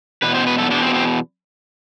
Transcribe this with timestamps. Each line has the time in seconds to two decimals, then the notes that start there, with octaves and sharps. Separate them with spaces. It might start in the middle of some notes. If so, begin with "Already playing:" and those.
0.22 E2 B2 B4
0.35 C5
0.47 B4
0.58 A4
0.70 E2 B2 D4
0.82 C4
0.94 C4